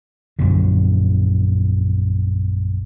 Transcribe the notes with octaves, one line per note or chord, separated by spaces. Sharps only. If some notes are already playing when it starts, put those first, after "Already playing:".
A#1 F#2 A#2 D3